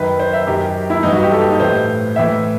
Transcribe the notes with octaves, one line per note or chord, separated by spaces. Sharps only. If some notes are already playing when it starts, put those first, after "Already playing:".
Already playing: F#2 D#3 B4
C5
E5
F#2 D#3 G4
E4
G2 E3 D#4
F#4
G4
A4
G4
D#4
A2 E3 C5
A2 E3 E5